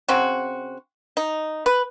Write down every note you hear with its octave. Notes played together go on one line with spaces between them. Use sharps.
C#3 C4 F#4
D#4
B4